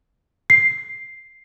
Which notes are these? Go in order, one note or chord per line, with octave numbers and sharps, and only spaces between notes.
C7